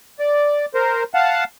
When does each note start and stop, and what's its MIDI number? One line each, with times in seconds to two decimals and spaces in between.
0.19 0.66 74
0.74 1.04 70
0.74 1.04 72
1.14 1.44 77
1.14 1.44 78
1.14 1.44 81